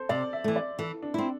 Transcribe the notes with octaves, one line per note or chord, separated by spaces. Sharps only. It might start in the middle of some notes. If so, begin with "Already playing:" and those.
Already playing: A4 C5
C3 D5
E5
E3 A3
D5
E3 A4
D4
C4 E4